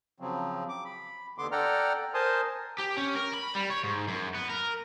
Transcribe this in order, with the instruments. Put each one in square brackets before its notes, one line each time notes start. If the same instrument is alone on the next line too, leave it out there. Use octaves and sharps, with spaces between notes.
[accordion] C#3 F3 F#3 C4
D6
B5
D#2 D3 B3 C6 D6
A4 D5 F#5 G5 A#5 F6
A#4 C5 G#5 A5 C6 D#6
[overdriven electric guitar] G4
C#4
A#4
B5
G3
C#5
G#2
F#2
B3
A#4